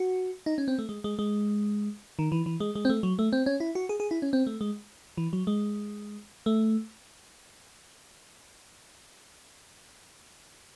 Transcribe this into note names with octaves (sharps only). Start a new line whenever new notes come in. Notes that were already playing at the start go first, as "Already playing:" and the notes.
Already playing: F#4
D#4
C#4
C4
A3
G#3
G#3
G#3
D#3
E3
E3
G#3
G#3
C4
A3
F#3
A3
C4
C#4
E4
F#4
G#4
G#4
E4
C#4
C4
A3
G#3
E3
F#3
G#3
A3